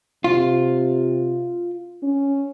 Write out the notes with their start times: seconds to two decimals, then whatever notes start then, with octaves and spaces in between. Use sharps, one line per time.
0.24 C3 F4
2.03 C#4